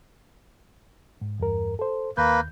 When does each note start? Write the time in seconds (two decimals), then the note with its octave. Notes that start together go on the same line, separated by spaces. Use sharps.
1.21 G#2
1.40 E2 G2 A#4
1.79 A4 C5
2.17 D#2 D#3 A#3 B4 G6